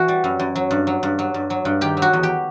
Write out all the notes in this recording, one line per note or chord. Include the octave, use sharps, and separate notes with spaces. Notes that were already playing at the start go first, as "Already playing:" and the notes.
Already playing: E3 F#4
G3
F#2
F#2
F#3
G2
F#3
G2
F#3
G2
F#3
G2
D#3 G4
F#3
F#4
E2
G4